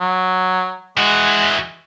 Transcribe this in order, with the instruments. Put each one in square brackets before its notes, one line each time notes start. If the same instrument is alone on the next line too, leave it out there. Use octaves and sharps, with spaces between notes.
[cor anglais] F#3
[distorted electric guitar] E3 F#4 [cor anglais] G#3